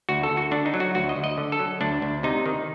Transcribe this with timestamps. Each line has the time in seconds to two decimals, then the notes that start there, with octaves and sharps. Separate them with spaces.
0.09 D2 F#4
0.23 A4
0.30 D2
0.37 F#4
0.51 D3 D4
0.66 D#4
0.74 F#3
0.80 F#4
0.95 D2 F#4
1.09 D#5
1.16 D2
1.24 D#5
1.38 D3
1.52 A4
1.59 F#3
1.81 D2 D4
2.02 D2
2.23 C3 D#4
2.46 D#3